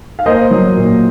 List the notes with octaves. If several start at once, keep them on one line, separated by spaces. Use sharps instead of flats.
F5
A#3 C5 D#5
F#3
A#2